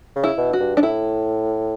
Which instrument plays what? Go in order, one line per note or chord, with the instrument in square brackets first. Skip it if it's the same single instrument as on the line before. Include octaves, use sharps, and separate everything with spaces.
[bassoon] C#3
[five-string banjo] E4
[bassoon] B2
[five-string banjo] F#4
[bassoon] G2
[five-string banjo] D4
[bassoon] A2 [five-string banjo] E4